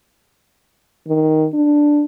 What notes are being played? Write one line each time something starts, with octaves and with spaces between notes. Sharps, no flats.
D#3
D4